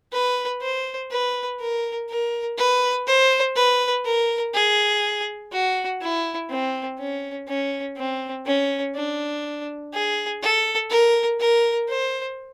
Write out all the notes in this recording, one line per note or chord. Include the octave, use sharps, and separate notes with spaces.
B4
C5
B4
A#4
A#4
B4
C5
B4
A#4
G#4
F#4
E4
C4
C#4
C#4
C4
C#4
D4
G#4
A4
A#4
A#4
C5